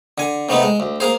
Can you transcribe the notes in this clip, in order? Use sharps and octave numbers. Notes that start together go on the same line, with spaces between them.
D3 G#5
C3 A3 B3 D#4
G#3
D2
A#3 G#4 C5